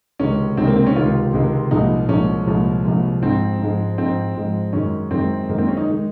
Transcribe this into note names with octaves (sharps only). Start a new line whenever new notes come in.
C#2 C3 D#3 G#3 C#4
C#2 C3 D#3 G#3 C4
A#3
C4
C#4
C#2 C3 D#3 G#3 F4
C#2 C3 D#3 G#3
C2 A#2 F3 G#3 D#4
C2 A#2 F3 G#3 C#4
C2 A#2 F3 G#3
C2 A#2 F3 G#3
G#2 F3 G#3 C4
G#2 F3 G#3
G#2 F3 G#3 C4
G#2 F3 G#3
F#2 D#3 G#3 C#4
F#2 D#3 G#3 C4
F#2 D#3 G#3 A#3
C4
C#4
D#4
D#3 G#3